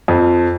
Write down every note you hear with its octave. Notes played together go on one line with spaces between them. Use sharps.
F2